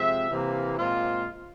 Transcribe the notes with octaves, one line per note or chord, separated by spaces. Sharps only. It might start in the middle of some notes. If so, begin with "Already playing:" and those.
Already playing: C3 F3 G#3 C4 E5
C3 E3 A#3
A#2 G#3 C4 F4